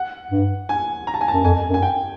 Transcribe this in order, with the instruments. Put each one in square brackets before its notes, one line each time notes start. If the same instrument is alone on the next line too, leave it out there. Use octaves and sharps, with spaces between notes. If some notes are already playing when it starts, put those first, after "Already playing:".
Already playing: [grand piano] F#5
[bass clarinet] G2
[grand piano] G#5
A#5
A5
G#5
A5
[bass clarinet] F#2
[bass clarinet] F2 [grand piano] G#5
[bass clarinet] F#2
[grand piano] G#5
G5